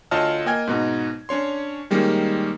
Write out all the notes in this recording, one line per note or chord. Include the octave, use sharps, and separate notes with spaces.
D2 F4 C#5 D#5 A5 F6
A#3 D#5 G5 G#5 F6 G#6
G#2 B2 D#4
C#4 D4 C#5 C6
D#3 G3 G#3 A#3 C#4